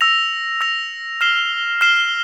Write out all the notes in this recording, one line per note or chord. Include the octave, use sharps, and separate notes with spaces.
E6 A#6 F7
E6 A#6 F7
F6 C7 E7 G7
F6 C7 E7 G7